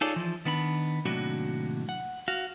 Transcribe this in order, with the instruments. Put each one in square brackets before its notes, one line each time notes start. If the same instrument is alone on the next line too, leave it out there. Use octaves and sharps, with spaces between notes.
[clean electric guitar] D#4 F4 G#4 A4 C#5 D5
E3 F3
D#3 B3 D4 B5
D#2 A2 C3 F#3 D4 F#4
F#5
F#4 F5